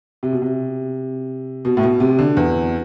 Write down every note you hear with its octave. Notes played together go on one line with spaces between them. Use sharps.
C3
B2
C3
B2
A2
B2
C3
D3
E2